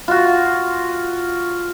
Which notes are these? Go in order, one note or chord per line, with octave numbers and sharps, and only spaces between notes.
F4 F#4